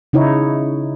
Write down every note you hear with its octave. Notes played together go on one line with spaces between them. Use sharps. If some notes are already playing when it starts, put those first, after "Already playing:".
C#3 D#4 E4 C#5